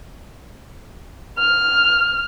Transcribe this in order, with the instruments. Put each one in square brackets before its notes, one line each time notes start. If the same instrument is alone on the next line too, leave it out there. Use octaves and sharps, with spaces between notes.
[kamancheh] F6